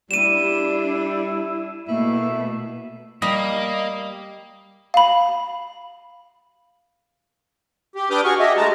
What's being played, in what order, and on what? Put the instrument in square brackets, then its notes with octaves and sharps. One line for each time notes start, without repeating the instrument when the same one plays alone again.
[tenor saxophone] G3 [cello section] D4 [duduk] E4 [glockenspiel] D#7 E7
[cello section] B2 A#3 [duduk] A3 [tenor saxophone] E4
[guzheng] G3 [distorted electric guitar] A#3 [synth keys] D#5
[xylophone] F5 B5
[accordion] G4
D4 B4 D6 D#6 F6 G6
F#4 G#4 C#6 F6
G4 G#4 D#5 E5
G#3 A3 A5 A#5